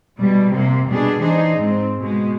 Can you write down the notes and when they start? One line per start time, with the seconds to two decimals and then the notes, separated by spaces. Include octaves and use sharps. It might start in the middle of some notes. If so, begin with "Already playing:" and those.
0.18 B2 G3
0.54 C3 A#3
0.89 B2 G3 B3 D4 G#4
1.20 E3 D4 D#4 G#4 C5
1.57 G#2 C4
2.00 B2 G#3